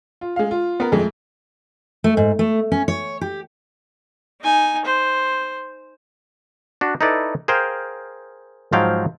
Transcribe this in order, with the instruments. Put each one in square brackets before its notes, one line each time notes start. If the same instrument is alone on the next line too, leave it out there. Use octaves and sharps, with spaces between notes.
[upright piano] F4
G#3 F5
F4
B3 A#4
F2 G#3 A3
[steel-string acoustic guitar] A3
G#2
A3
C#4
C#5
G4
[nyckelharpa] D#4 G#5
C5
[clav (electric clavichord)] D4 F#4
D#4 E4 A4 B4 D5
G#4 A#4 C5 F5 G5
G#2 F3 F#3 F5 G5